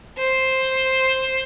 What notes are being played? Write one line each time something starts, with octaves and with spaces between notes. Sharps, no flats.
C5